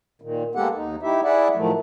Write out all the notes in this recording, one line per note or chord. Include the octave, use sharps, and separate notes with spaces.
A#2 D#3
G#3 A#3 B3 G4 A4 F#5
D#2 D#4
D#4 E4 G4 E5
E4 G#4 D5 E5 F#5
A2 D#3 F3 F#3 A3